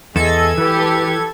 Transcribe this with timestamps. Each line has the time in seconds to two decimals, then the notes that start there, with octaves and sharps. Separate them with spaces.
0.16 E2 G#4 A4 D#5 G#6
0.58 E3 G4 B4